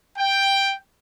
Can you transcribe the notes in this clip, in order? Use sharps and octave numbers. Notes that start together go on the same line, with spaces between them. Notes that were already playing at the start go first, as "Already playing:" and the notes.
G5